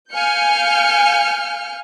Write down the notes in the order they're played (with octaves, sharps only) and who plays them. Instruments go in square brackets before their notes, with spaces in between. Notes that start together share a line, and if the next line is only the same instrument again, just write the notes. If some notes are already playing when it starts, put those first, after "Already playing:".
[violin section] F5 G#5 F6 G6 C#7